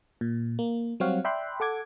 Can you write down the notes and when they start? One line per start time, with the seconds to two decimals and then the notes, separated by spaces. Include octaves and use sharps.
0.21 A#2
0.59 A#3
1.00 F#3 G3 C4 C#5 F5 F#5
1.24 D5 E5 G5 B5 C6 F#6
1.60 A4 F#5 D6 G#6